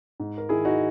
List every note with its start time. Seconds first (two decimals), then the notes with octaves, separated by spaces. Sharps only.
0.20 G#2
0.38 A#4
0.49 D#3 E4 G#4
0.65 D#4 F#4